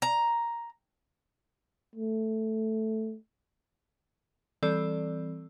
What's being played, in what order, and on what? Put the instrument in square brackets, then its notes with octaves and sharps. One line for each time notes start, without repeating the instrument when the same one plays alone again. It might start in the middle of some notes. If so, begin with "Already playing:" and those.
[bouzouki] A#5
[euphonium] A3
[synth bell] E3 G3 C4 A4 D5 E6